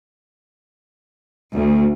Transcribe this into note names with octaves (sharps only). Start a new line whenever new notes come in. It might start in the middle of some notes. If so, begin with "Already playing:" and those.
D2